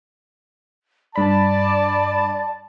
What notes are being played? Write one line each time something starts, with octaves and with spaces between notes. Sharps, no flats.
G2 D5 A5 B5